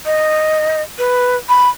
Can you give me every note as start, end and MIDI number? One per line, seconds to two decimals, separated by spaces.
0.06 0.82 75
0.98 1.36 71
1.49 1.69 83